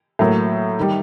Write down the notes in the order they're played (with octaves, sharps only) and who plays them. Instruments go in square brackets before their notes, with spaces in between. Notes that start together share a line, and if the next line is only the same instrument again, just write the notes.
[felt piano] A2 F#3 A#3
D#3 G3